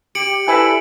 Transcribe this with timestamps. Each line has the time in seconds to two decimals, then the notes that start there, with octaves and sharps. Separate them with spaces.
0.15 G4 C#7 D7 F#7
0.48 E4 A4 B4 G#5